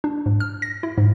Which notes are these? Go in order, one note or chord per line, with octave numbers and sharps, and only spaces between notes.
D4
G#2
F6
A#6
E4
G#2